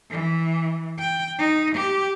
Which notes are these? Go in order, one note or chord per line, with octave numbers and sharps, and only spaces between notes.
E3
G5
D#4
G4